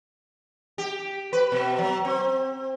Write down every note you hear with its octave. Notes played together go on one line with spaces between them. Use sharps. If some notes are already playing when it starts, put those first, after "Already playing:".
G4
B4
B2
F#3
C4